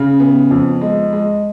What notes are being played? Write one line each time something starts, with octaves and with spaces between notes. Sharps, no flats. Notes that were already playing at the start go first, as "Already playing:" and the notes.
Already playing: C#3
B3
F2
G#3
G#3